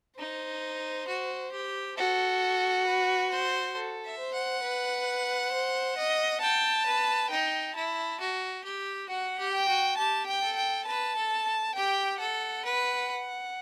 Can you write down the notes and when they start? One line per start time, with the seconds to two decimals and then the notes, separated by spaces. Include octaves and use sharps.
0.19 D#4 C5
1.08 F#4
1.52 G4
1.98 F#4 A4
2.86 B4
3.30 C5
3.75 A4
4.05 E5
4.19 C5
4.34 F#5
4.64 B4
5.52 C5
5.98 D#5
6.42 G5 A5
6.86 B4
7.30 D#4 G5
7.75 E4 A5
8.20 F#4
8.64 G4
9.08 F#4 F#5
9.39 G4
9.53 G5
9.68 F#4
9.98 G4 A5
10.27 G5
10.42 A4
10.56 G5
10.86 B4 A5
11.16 A4
11.76 G4 G5
12.20 A4 F#5
12.65 B4